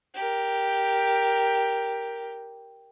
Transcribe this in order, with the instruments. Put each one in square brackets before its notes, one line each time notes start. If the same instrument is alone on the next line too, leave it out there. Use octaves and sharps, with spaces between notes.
[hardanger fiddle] G4 A#4